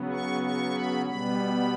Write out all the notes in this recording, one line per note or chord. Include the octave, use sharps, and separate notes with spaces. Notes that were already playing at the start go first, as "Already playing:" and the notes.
Already playing: C#3 F#3 B3
C#6
C#6
B5
B2 G3 B3 B5